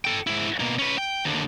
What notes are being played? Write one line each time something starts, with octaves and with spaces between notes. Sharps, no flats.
A4 G5
G#2 E4
B2 A#3
C#4 B4
G5
D#2 D3